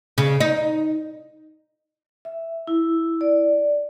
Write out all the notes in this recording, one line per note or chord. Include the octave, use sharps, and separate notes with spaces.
C#3
D#4
E5
E4
D5